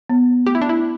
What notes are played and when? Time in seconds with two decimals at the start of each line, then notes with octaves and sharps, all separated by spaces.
0.10 B3
0.46 A3 G4
0.55 E4
0.61 D4
0.69 E4